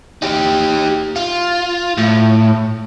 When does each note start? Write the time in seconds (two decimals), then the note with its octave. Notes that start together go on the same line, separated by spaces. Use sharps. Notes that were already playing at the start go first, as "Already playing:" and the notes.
0.22 D#4 G4
1.16 F4
1.98 A2